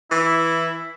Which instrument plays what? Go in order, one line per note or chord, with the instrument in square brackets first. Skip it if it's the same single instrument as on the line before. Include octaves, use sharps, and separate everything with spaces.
[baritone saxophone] E3 [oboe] E4